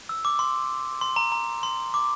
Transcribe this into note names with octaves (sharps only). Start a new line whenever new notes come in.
E6
D6
C6
C6
A#5
A#5
C6
D6